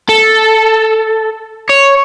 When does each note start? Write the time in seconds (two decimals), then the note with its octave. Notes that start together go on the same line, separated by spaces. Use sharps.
0.09 A4
1.70 C#5